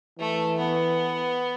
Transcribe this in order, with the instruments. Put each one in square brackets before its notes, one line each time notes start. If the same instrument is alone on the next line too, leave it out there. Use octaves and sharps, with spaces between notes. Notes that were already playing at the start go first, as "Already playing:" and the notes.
[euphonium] E3 [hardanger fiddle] A3
[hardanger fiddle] B3